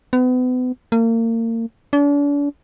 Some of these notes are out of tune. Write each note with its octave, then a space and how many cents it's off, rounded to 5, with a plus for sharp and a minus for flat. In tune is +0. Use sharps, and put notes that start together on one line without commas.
B3 +35
A#3 -35
D4 -40